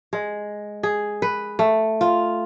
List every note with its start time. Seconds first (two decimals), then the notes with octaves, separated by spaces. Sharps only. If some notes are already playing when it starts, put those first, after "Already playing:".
0.13 G#3
0.83 G#4
1.22 B4
1.59 A3
2.01 F4